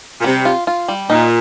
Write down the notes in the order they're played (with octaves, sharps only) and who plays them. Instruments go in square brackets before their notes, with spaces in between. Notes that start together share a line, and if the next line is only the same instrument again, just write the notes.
[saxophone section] A#2
[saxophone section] C3 [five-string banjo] G3
[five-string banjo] F4
F4
G3
[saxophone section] A#2 [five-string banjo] D#4